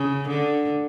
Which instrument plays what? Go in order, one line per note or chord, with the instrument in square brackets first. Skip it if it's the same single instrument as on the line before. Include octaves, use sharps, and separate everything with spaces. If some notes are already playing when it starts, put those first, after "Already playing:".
Already playing: [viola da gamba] C#3
D3